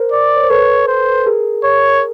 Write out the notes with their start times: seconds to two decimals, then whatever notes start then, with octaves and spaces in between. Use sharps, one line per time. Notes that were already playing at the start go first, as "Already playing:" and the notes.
Already playing: A#4 C5
0.12 D5
0.36 C#5
0.43 C5
0.50 A4 B4 C#5
0.88 C5
1.26 G#4 A#4
1.64 C#5